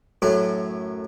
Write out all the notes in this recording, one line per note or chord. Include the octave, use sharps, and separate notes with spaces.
F#2 A2 F#3